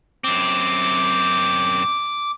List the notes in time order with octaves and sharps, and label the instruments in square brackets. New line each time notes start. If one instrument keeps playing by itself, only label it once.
[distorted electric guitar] F#2 C4 [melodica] D6